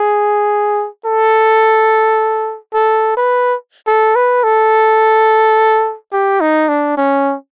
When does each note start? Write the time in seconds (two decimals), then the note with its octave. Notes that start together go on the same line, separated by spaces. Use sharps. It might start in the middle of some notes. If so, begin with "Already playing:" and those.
Already playing: G#4
1.05 A4
2.74 A4
3.17 B4
3.87 A4
4.15 B4
4.44 A4
6.13 G4
6.41 D#4
6.69 D4
6.97 C#4